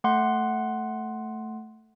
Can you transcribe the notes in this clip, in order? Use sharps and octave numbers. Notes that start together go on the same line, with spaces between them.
A3 F#5 C6